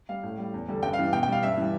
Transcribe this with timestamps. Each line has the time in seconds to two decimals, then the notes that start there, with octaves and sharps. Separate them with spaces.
0.09 G3 F5
0.23 A2
0.38 G3
0.53 E2
0.68 D3 G3
0.83 G2 G5
0.93 F5
0.99 E3 G3
1.13 B2 G5
1.23 G5
1.28 G3 F5
1.43 G2 E5
1.57 E3 G3